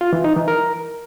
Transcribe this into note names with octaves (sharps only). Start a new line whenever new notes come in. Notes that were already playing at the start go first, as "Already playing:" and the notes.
F4
E3
D#4
E3
A#4